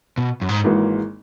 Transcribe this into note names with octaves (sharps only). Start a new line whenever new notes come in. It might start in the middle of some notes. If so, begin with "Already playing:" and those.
B2
F#2
G#2
G#1 G#2 E3 A#3